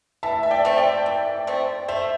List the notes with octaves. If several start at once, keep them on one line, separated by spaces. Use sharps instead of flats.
E3 E5 A5
E5
D5 G5
A3 C4
D5 G5
E3
A3 C4
A3 C5 E5